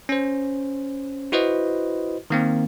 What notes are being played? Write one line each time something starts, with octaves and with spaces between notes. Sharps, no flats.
C#4 C5
E4 F#4 B4 C5 D#5
D#3 A#3 C4